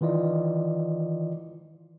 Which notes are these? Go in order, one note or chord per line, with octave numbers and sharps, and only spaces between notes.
D#3 E3 F4 D5 D#5